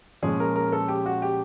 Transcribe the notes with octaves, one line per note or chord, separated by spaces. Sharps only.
A#2 F3 G#3 C#4 G#4
A#4
A#4
A4
G4
F#4
G4